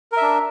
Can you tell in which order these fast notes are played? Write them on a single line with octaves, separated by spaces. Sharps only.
A#4 E5 D4